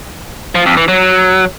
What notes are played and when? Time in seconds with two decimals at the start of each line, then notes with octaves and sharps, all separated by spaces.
0.55 F3
0.66 F2
0.77 E3
0.88 F#3